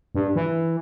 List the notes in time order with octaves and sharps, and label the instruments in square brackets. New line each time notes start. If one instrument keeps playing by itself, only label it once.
[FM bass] G2
E3